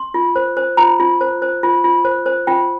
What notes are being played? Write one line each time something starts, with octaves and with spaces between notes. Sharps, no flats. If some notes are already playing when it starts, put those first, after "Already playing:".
Already playing: C6
F4
C5
C5
F4 A#5
F4
C5
C5
F4
F4
C5
C5
F4 G5